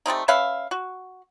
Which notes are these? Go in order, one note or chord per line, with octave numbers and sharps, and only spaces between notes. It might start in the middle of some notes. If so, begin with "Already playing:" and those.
G3 A3 C4 D#4
C#4 B4 E5 F5
F#4